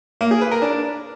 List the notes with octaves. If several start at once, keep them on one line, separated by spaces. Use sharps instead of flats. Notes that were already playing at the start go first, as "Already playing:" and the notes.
A#3
G#4
B4
A#4
D4